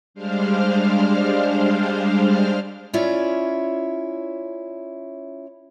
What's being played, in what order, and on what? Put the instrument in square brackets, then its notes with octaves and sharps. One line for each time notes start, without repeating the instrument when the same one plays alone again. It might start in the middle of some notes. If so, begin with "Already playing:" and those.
[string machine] G3 G#3 D4 C5 F5 F6
[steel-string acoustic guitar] C#4 E4 F4 C#5 D5 E5